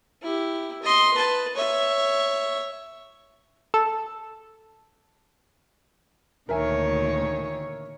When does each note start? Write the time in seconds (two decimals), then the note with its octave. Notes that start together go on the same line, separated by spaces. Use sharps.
0.22 E4 G4
0.82 D#5 C6
1.14 B4 A5
1.55 C#5 E5
3.74 A4
6.49 D2 A#2 D#3 A#4 C#5 E5 G#5